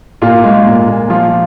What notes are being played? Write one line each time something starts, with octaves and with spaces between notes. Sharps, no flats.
A#2 F4
G#3
A#2
A#2
F3 F4